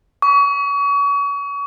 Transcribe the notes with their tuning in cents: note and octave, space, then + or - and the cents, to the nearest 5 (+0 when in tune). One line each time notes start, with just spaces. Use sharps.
C#6 +35